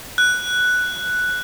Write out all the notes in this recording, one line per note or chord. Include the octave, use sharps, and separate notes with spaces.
F#6